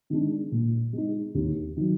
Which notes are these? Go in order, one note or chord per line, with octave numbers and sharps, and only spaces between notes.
D#3 G#3 D4
A#2
G#3 D#4
D#2
D#3 F#3